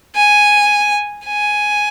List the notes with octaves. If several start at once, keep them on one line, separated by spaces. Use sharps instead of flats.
G#5
G#5